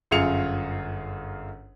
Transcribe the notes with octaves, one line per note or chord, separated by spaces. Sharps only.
G1 F#2 F4 G#4 C#7 F7